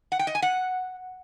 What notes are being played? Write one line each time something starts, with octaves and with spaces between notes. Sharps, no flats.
F#5
G5
D#5
G#5
F#5